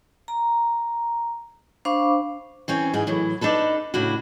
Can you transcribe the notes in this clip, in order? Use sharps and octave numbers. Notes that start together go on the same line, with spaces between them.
A#5
D4 C5 F5 B5 C#6 D6
E3 C4 C#4
G#2 E3 G#4
A2 E3 F#3
D4 D#4 A4 B4
A2 C#3 D4 E4 F#4